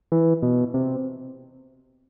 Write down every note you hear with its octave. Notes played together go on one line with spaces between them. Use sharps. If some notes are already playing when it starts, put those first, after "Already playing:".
E3
B2
C3